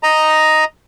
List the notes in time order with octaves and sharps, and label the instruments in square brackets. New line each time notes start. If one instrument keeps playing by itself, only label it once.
[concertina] D#5 A#5